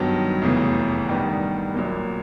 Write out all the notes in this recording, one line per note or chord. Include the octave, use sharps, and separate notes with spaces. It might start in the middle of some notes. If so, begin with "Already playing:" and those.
Already playing: G2 D#3 F#3 B3
F1 E2 C#3 E3
G2 D#3 G3 B3
A#1 A#2 F#3 A#3